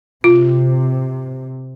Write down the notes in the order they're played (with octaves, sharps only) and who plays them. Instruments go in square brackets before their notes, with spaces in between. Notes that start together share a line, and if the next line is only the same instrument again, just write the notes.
[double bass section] C3 [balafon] F4